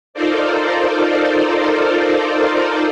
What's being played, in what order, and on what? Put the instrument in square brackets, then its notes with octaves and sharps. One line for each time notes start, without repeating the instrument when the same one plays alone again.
[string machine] D#4 F4 A4 A#4 C5 D5